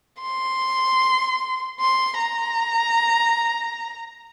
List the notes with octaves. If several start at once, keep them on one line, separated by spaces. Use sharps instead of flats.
C6
C6
A#5